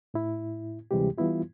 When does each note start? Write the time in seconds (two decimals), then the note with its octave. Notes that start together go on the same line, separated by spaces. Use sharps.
0.14 A2 E4
0.91 D2 C3 E3 G3 G#3 G4
1.18 E3 G3 B3 E4 F4